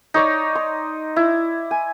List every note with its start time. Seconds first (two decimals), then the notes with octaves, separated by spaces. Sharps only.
0.14 D#4 C#5 D5
0.55 C6
1.16 E4
1.71 G#5